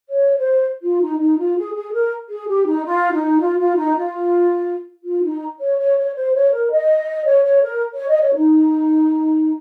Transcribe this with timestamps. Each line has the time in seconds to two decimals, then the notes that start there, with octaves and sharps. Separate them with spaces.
0.09 C#5
0.37 C5
0.83 F4
1.02 D#4
1.19 D#4
1.38 F4
1.57 G#4
1.74 G#4
1.93 A#4
2.29 G#4
2.49 G4
2.67 D#4
2.85 F4
3.13 D#4
3.39 F4
3.59 F4
3.76 D#4
3.96 F4
5.05 F4
5.24 D#4
5.60 C#5
5.78 C#5
5.98 C#5
6.15 C5
6.34 C#5
6.52 A#4
6.71 D#5
7.26 C#5
7.44 C#5
7.62 A#4
7.95 C#5
8.09 D#5
8.22 C#5
8.36 D#4